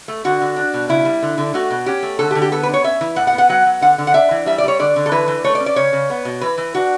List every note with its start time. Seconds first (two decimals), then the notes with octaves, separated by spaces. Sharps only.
0.08 A3
0.24 D3 F#4
0.41 D3
0.56 D4
0.74 B2
0.89 C#3 E4
1.05 G3
1.22 D3
1.38 D3
1.54 A3 F#4
1.70 B2
1.86 C#4 G4
2.03 A3
2.19 D3 A4
2.31 G4
2.35 D3
2.42 G4
2.52 B3 A4
2.63 B4
2.69 D4
2.74 C#5
2.84 C#4 E5
3.01 E3
3.16 A2 F#5
3.27 F#5
3.33 B3
3.38 F#5
3.49 F#3 F#5
3.66 F#3
3.81 D3 F#5
3.98 D3
4.07 F#5
4.14 D4 E5
4.31 E3
4.46 G3 E5
4.58 D5
4.64 G3 C#5
4.79 D3 D5
4.96 D3
5.06 A4
5.11 E3 B4
5.28 E3
5.44 A3 C#5
5.55 D5
5.60 C#4
5.66 D5
5.76 C#3 C#5
5.93 C#3
6.10 B3
6.25 B2
6.41 E3 B4
6.58 E3
6.75 D4 F#4